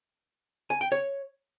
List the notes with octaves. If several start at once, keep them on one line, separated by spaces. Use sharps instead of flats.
G#5
G5
C#5